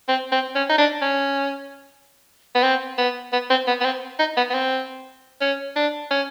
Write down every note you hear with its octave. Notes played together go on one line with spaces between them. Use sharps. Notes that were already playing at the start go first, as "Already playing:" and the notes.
C4
C4
C#4
D#4
D4
C#4
B3
C4
B3
B3
C4
B3
B3
C4
D#4
B3
B3
C4
C#4
D4
C#4